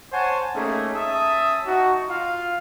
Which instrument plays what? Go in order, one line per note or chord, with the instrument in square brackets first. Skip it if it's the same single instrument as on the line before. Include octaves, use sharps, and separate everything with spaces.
[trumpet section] C5 C#5 F#5 G#5 A5
A3 A#3 C#4 D#4 G#4
C#4 E5 A5 D#6
D#4 F#4
F4 F5